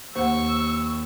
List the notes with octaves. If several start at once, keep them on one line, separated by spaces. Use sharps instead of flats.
D#2 C5 F#5 C#6 E6